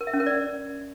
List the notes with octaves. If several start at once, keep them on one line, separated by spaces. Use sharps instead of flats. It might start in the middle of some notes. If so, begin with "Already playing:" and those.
A#4
E5
C#4
A#4
D5